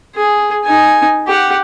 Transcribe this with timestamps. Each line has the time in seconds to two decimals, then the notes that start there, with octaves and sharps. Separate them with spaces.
0.15 G#4
0.64 D#4 G#5
1.27 G4 F#5